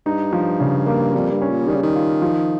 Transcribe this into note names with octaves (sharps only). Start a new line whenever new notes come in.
G2 D#4
F3
C#3
A#3
F2 G3
G2
C#4
A#2
D#3 G3
C#3
D#3
F4
F3